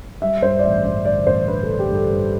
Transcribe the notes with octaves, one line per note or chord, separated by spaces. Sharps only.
G3 E5
G2 C5
D5
A1 E5
G2 D5
D3 D5
A1 C5
D3 B4
A4
D3
G4
G2
A4
G2